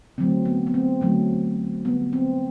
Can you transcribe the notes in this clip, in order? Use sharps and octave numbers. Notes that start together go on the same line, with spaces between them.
D3 F#3 A3 C4
B3
B3
C4
D3 F#3 A3
D3 G3 B3
C4